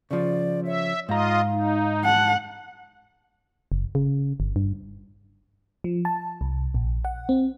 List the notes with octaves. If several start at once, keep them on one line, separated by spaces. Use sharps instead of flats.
C#3 F3 D5
C#5 E5
G#2 F4 D#5 F5 A#5
D#4
F#5 A5
F#1
C#3
G1
G2
F3
A5
C2
A#1
F#5
C4